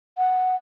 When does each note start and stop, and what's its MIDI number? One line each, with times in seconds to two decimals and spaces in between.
0.18 0.55 78